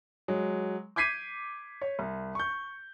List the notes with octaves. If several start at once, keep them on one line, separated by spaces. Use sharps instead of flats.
F#3 G#3
D6 G6 G#6 B6 C7 D#7
C#5
C2
C#6 G6